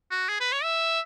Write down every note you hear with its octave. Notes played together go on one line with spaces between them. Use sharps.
F#4
G#4
B4
C#5
E5